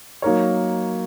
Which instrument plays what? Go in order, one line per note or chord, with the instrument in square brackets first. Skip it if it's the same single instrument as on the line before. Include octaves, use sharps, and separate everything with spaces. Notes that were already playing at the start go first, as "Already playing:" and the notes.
[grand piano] F#3 A#3 D#4 A#4 C#5